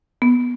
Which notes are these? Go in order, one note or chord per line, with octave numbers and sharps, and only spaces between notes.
B3